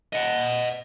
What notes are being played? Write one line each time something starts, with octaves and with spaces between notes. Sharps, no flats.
D#5 F#5